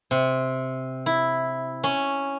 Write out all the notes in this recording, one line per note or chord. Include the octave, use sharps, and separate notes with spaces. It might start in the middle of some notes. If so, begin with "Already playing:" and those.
C3
E4
C#4